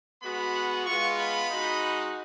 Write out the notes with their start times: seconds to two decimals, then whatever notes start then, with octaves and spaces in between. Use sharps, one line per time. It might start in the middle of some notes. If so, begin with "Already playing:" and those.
0.23 G#3 B3 F#4 B5
0.86 G#3 B3 F4 C#6
1.18 B5
1.50 G#3 D#4 F#4